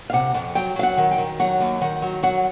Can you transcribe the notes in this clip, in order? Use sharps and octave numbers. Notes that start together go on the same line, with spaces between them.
F5
C3 F#5
F2
F#3 G5
F#3 F5
F#5
D#3
G5
D#3
F#3 F#5
D#2
D#3 F#5
F#3
F#3 F#5